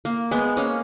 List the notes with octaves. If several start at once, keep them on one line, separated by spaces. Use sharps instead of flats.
A#3
G#3 B3
A#3 C#4